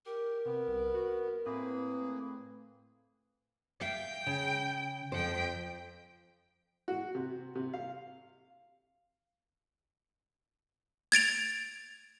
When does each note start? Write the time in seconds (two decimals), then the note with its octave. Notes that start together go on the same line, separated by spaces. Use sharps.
0.06 G4 A#4
0.46 C3 B3
0.68 C2
0.94 F#4
1.46 A2 A#3 C4 G#4 B4
3.81 E5 F5 G5
4.27 C#3
5.12 F2 C5 G5
6.88 F#4
7.15 C3
7.55 C3
7.73 F5
11.12 G#6 A6 D7 F7